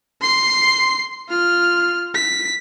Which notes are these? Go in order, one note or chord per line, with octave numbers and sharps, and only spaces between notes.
C6 C7
F4 F6
B6